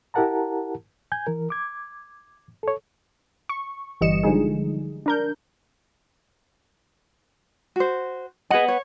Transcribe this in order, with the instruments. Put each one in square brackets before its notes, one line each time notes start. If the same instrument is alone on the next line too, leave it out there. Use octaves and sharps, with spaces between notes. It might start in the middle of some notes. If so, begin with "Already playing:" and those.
[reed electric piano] E4 G4 A#4 F#5 A5 A#5
G#5 G6 G#6
E3 A#4
D6 G#6
A4 C#5
[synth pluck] C#6
G1 E3 G3 D#5 C#7 E7
D3 F3 G3 G#3 D#4 G#4
D4 A#4 G6
[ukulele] F#4 C5
[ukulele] G#4 D#5 [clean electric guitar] B4 F#5
[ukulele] C#5